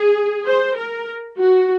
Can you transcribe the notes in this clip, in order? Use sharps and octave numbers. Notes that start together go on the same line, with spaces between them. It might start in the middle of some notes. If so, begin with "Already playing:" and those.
Already playing: G#4
C5
A#4
F#4